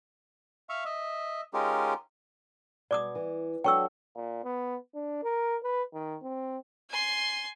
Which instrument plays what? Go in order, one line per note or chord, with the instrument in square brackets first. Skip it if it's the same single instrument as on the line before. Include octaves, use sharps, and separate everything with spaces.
[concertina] E5 F5 C#6
D#5 E5
G#3 C#4 D#4 F4 G4 A#4
[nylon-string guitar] B2 [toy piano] D5 D6 D#6
[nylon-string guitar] E3
[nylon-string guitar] F#3 D4 A4 [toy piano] G5 C#6 E6
[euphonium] A#2
B3
D4
A#4
B4
D#3
C4
[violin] G#5 C6